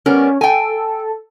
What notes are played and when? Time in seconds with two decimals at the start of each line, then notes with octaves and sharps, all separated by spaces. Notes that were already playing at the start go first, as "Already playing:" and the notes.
0.06 G3 B3 C#4 A#4
0.41 A4 G5 G#5